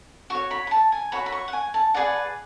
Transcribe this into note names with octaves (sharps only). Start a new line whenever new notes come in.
F#4 C#5 C#6
B5
B5
A5
G#5
F#4 C#5 B5
B5
C#6
F#5
G#5
A5
G#4 B4 D5 F#5